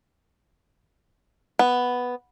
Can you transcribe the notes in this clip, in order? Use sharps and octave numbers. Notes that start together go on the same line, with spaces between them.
B3